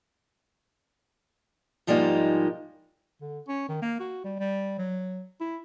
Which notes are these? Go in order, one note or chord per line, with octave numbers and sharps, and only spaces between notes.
G#2 F3 G3 G#3 A#3 D#4
D3
C#4
D#3
A#3
F#4
G3
G3
F#3
E4